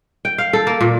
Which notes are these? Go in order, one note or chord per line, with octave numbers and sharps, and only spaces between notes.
G5
F5
A4
A#3
A#2